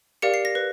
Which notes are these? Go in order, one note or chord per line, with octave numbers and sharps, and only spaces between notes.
G4 A#4 D5 F5 C#7
C7
A#6
B4